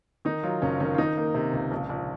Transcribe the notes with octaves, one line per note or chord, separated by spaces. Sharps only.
D#3 D#4
F#3 F4
F#1 C#4
D#3 C#4
F4
D#3 D#4
A#3
C3
C#2
A#1
A#1